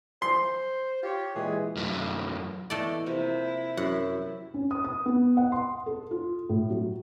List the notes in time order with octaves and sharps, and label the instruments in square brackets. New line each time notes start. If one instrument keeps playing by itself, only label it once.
[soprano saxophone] C5 [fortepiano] C6
[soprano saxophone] F4 [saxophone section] G4 C#5
[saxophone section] A#2 E3 G#3 [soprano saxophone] G#4
[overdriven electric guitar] F#2 A3
[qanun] E3 B3 D#5 [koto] A3 A4 D5
[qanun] C3 F3 A#3 [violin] E4
[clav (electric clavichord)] F#2 [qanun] G4 [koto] F#5
[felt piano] C#4
D#6
D#6
B3
F#5
C6
A4
F4
A2
F#3